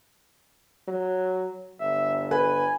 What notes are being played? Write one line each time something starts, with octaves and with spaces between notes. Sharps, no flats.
F#3
G1 E5
B4 G#5